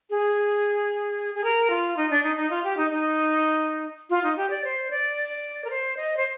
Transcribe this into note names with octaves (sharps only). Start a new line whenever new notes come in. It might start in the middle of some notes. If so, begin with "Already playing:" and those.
G#4
G#4
A#4
F4
D#4
D4
D#4
D#4
F4
G4
D#4
D#4
F4
D#4
G4
D5
C5
D5
A#4
C5
D#5
C5